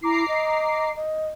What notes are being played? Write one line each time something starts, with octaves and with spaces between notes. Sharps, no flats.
E4 A#5 D6 C7
D#5
D#5